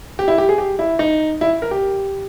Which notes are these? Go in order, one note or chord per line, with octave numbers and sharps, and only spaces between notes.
G4
E4
G4
G#4
G4
E4
D#4
E4
A#4
G4